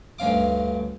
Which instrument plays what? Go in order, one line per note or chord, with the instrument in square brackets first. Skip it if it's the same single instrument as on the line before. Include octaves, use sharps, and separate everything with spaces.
[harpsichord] D2 G2 C#4 F5 D6